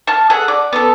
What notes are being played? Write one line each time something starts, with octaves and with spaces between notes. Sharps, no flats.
A5 F6
G#4 A4 F#5
D5
B3 A4